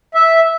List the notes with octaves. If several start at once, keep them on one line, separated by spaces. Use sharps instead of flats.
E5